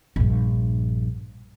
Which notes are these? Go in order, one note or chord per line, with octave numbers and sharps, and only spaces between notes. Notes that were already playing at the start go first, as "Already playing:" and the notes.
A#1 G2